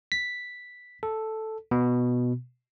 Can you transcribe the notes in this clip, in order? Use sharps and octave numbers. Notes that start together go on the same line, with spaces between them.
B6
A4
B2